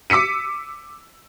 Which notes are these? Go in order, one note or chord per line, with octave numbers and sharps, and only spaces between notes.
D6 E6 B6 C#7 D#7